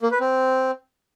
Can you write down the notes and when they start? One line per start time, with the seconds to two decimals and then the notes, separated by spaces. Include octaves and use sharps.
0.02 A#3
0.11 B4
0.20 C4